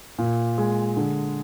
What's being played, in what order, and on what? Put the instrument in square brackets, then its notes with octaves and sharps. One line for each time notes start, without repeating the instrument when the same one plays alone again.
[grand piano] A#2
G#3
D3